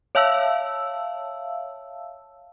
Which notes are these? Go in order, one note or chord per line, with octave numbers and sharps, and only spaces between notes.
C#5 E5 F5 A5 E6